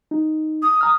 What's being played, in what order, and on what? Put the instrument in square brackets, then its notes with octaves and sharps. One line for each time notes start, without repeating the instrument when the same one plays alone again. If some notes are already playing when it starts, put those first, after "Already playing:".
[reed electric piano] D#4
[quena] D#6
[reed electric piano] A#5 F6